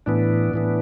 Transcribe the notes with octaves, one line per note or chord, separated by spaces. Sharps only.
A2 E3 B3 D4
A2 E3 B3